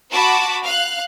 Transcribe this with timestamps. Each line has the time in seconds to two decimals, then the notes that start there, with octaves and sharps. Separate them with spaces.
0.11 F#4 A5 B5 D6
0.63 F5 F#6